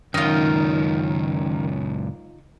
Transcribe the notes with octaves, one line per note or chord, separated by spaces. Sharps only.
C#2 F#2 D#3 D#4 F4